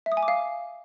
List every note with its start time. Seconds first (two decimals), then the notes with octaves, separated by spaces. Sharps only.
0.06 E5
0.12 D#6
0.17 G#5
0.23 D6
0.28 F5